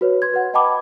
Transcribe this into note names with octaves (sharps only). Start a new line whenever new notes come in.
F#4 B4 C#5
C6 G#6
B4 F#5
D#5 F#5 G5 A5 B5 D6